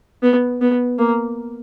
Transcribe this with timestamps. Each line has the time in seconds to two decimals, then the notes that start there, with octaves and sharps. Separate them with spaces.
0.23 B3
0.61 B3
0.98 A#3